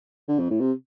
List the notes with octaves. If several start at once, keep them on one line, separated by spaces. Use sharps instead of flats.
D3
F2
A2
C3